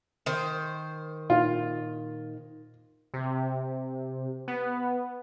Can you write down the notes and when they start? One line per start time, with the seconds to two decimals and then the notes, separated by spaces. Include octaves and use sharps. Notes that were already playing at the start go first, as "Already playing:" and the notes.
0.26 D#3 C5
1.30 A#2 D#4 F4
3.14 C3
4.48 B3